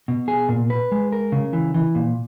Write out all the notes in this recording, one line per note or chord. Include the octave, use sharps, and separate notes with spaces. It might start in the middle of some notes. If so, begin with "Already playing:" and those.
B2
G#4
A#2
B4
G#3
A#4
C#3
E3
E3
A#2